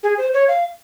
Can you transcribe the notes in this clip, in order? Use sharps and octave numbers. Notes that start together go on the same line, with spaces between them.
G#4
C5
C#5
F5